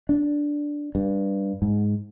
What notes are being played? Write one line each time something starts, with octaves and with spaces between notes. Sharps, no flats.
D4
G2
G#2